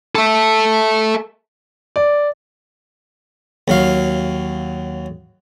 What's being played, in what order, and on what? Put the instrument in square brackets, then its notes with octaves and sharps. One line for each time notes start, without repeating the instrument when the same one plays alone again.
[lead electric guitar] A4 E5
[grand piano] D5
[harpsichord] D#2 F#3 F5